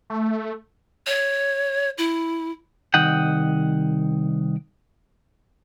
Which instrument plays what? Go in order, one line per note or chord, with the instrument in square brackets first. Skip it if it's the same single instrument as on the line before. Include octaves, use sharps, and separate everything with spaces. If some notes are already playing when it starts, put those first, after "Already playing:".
[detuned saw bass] A3
[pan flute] C#5
E4
[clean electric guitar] C2 D#3 D#5 F#5 G5